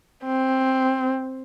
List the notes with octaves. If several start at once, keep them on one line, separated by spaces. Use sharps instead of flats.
C4